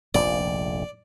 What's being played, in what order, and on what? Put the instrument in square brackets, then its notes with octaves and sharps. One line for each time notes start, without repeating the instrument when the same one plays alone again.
[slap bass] F1 A#1 F2 [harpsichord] D5